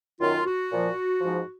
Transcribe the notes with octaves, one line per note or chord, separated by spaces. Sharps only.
F#2 D#3 F4
F#4
A#2 F3
G#2 F3